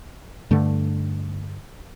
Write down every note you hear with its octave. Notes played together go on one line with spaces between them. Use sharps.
G2 D3 A3